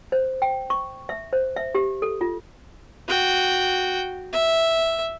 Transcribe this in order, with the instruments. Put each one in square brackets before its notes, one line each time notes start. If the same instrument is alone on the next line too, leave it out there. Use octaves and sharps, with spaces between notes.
[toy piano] C5
G5
C#6
E5
C5
E5
G4
A4
F4
[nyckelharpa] F#4 G5
E5